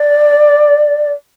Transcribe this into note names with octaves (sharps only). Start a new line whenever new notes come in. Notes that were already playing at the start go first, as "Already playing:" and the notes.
Already playing: D5